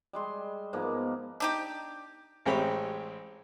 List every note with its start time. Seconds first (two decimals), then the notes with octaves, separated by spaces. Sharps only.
0.13 G3 G#3 C6
0.73 G#2 F3 A#3 B3
1.40 D4 D#4 G4
2.46 A1 G#3 C4 G4 C#5 B5